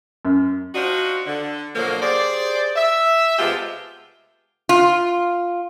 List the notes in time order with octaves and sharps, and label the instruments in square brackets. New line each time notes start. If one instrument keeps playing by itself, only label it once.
[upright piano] F#2
[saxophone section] C4 D4 D#4 F4 F#4
D3
B2 D3 F3 F#3 A#3
G4 G#4 C5 D5
E5
C3 G#3 A3 B3 F4 G4
[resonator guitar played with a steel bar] F4